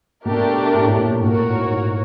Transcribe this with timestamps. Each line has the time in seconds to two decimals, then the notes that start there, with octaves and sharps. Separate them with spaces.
0.25 B2 A3 D4 G4 A#4
0.74 A2
0.86 A2
0.98 A#2
1.11 A2
1.22 A#2 F#4 A#4 C#5
1.38 A2
1.55 G#2
1.71 G#2